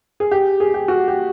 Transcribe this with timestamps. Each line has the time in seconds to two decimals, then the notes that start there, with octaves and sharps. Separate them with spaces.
0.20 G#4
0.31 G4
0.60 G#4
0.74 G4
0.88 F#4
1.08 G4